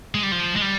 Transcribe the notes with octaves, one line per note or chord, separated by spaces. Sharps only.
G#3
G3
F3
G#3
G3